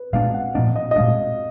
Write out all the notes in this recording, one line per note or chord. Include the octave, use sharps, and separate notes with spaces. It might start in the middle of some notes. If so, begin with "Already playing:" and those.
Already playing: B4
A#2 G#3 B3 D4 F5
F#5
A#2 F3 A#3 D4 D#5
D#5
D#5
A#2 G#3 D4 F5